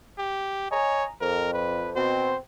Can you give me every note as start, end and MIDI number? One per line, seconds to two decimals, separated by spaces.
0.18 0.70 67
0.71 1.04 73
0.71 1.06 75
0.71 1.06 80
0.71 1.06 82
1.21 1.90 41
1.21 1.50 70
1.53 1.90 71
1.96 2.34 47
1.96 2.34 60
1.96 2.36 72